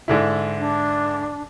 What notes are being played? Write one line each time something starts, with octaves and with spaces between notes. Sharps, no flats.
G#2 D3 E4
D4